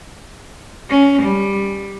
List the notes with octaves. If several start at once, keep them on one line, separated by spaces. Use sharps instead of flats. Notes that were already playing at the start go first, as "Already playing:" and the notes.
C#4
G3